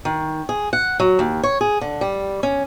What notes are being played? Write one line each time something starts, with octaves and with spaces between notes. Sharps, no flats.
D#3
G#4
F#5
F#3
D#2
C#5
G#4
D3
G3
C#4